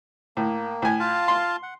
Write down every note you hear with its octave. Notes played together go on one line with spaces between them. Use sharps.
A2 A#3
A2 G#5
F4 F5 A5
C6
F#5